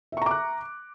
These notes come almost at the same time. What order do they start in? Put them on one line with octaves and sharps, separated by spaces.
E5 C#6 A#5 D6 F#6